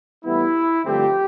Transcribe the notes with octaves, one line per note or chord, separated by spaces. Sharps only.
A2 E3 G3 B3 E4
G2 D3 F3 A3 C4 G4